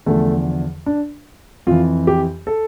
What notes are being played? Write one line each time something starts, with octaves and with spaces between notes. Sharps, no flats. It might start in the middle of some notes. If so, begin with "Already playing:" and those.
E2 D3 F3 A3
D4
F2 E3 F4
G4
A4